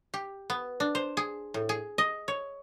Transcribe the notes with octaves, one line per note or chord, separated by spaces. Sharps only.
G4
B3
D4
C5
G#4
A2
G#4
D#5
C#5